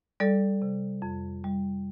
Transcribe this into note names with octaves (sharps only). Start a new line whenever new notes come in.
G3 A4 D5
C3
F2
G3